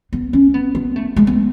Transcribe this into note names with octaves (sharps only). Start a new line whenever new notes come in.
B3
C#4
B3
B3
A3
G#3
B3